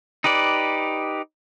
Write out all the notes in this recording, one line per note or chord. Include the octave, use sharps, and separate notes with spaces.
D#4 G4 B4 D5